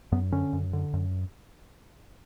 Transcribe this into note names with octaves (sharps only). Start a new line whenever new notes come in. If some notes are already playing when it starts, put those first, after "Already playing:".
F#2 B3
D3 C#4
F#2
D3
F#2